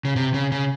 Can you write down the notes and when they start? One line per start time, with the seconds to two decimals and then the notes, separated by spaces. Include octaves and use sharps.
0.05 C#3
0.16 C3
0.34 C#3
0.52 C#3